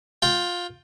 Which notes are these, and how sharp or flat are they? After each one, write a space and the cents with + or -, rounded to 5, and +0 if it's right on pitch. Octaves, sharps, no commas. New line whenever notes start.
F4 +15 G5 +0